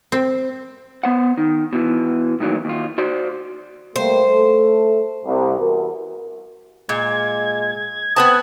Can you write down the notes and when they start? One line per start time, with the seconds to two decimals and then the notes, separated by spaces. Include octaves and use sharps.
0.12 C4
1.03 B3 C5 F#5
1.37 D#3
1.73 B2 E3
2.40 A2 D#3 E3 F#3 A#3
2.65 D#2 F4
2.98 F#4 C5 D5 C6
3.96 G3 A3 A#3 C5
4.27 A3 A4
5.26 C2
5.60 E2 F#4 A#4
6.89 A#2 G#3 G#6
8.16 B3 C4 B4 A5 D#6